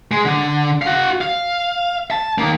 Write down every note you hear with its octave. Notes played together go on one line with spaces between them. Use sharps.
G#3
D3
F#4 F5
F5
A5
D#2 A#3